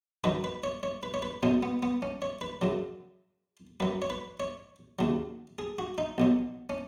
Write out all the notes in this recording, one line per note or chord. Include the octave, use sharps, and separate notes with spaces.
F#2 D#3 F#3 B4
B4
C#5
C#5
B4
C#5
B4
B1 B2 F#3 C#4
B3
B3
C#4
C#5
B4
F#2 C#3 F#3
F#2 F#3 B4
C#5
B4
C#5
D#2 C#3 F#3
G#4
F#4
D#4
B1 B2 F#3
C#4